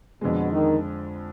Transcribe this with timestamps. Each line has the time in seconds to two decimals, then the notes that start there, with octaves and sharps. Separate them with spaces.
0.21 F2 B2 D3 G#3
0.51 D#3